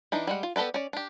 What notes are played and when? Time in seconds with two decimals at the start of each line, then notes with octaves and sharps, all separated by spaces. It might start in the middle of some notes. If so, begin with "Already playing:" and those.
0.12 E3 D4 D#4
0.27 G3 G#3 F#5
0.43 F4
0.56 B3 G4 A4 B4 D5
0.74 C#4 D5
0.93 D4 G4